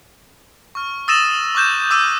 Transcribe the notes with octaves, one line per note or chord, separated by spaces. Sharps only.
C#6 F6
D#6 E6 A6 A#6 D#7 E7
C#6 D6 F#6 G6 E7
D6 E6 D#7